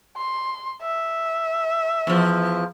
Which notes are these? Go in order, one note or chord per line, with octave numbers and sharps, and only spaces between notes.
C6
E5
E2 F3